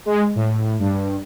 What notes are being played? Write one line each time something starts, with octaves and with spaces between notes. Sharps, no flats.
G#3
A2
G2